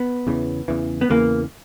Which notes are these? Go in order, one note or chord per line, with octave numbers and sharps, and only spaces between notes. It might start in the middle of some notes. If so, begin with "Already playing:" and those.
Already playing: B3
E2 C#3 E3
E2 C#3 E3
B3
E2 C#3 E3 A#3